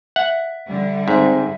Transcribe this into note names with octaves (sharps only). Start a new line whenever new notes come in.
E5 F#5
D3 G3
G#2 C4 E5